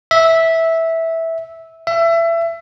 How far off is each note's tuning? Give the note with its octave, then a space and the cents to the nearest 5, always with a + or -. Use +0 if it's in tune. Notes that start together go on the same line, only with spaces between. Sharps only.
E5 -10
E5 +25